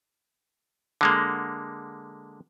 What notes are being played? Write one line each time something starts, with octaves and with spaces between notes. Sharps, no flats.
D3 G#3 A#3